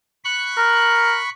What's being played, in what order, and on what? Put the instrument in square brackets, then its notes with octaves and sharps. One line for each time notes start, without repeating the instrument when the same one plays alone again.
[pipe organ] B5 C#6 F#6
[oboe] A#4